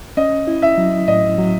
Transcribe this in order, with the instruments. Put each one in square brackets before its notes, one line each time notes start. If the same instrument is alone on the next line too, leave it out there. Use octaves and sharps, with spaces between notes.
[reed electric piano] C#4 [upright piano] D#5
[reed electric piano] E4
[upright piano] E5
[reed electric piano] F#3
[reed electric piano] A2 [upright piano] D#5
[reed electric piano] F#3